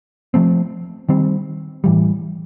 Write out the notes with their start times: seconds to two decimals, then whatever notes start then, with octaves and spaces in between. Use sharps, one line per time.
0.34 F3 A3 C4
1.09 D#3 G3 C4
1.84 A2 E3 G3